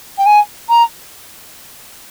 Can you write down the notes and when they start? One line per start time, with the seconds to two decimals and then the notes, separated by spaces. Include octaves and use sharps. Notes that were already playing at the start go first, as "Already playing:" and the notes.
0.18 G5
0.26 G#5
0.69 A#5